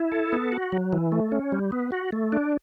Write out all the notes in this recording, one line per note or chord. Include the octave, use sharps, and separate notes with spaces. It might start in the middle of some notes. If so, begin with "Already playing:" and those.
Already playing: E4
A4
B3
F#4
F#3
E3
A3
C#4
G3
B3
F#4
A3
D4